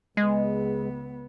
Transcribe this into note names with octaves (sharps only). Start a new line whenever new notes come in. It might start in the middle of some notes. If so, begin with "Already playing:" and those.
C#2 G#3 B3